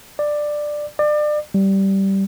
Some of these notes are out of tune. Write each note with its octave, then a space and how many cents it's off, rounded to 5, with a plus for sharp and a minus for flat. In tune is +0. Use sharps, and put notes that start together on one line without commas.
D5 +10
D5 +30
G3 -10